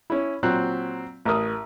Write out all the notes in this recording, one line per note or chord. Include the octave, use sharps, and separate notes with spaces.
C#4 E4
A#2 F#3 C4 F#6
A1 A#4 D#6